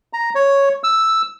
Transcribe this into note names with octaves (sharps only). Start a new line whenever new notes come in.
A#5
C#5
E6